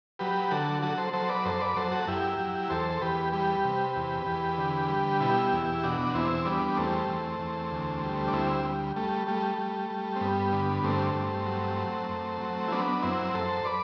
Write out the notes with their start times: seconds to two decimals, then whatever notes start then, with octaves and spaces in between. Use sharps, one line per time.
0.19 F#3 G4 B4
0.51 D3 F#4 A4
0.82 F#3 F#4 A4
0.98 A4 C5
1.13 F#3 A4 C5
1.29 B4 D5
1.45 F#2 A4 C5
1.60 B4 D5
1.76 F#3 A4 C5
1.91 F#4 A4
2.07 F#2 E4 G4
2.39 F#3
2.70 E2 A4 C5
2.91 A4
3.01 E2 G4 B4
3.33 G3 G4 B4
3.64 C3
3.96 E2
4.26 E2
4.58 D3
4.89 G3
5.20 B2 E4 G4
5.52 E2
5.83 B2 D4 F#4
6.14 E2 C4 E4
6.45 G3 B3 D4
6.68 B3
6.77 E2 A3 C4
7.09 E2
7.39 E2
7.71 D2
8.03 G3
8.28 D4
8.33 D2 C4 E4
8.64 G3
8.96 G3 A3
9.27 G3 A3
9.58 G3
9.90 G3
10.16 C4
10.21 G2 B3
10.52 D3 B3
10.83 G2 A3 C4
11.15 G2
11.46 F#3
11.78 F#3
12.09 F#2
12.40 F#3
12.68 E4
12.71 F#3 B3 D4
12.98 D4
13.02 F#2 C4 E4
13.34 F#2 A4 C5
13.65 B4 D5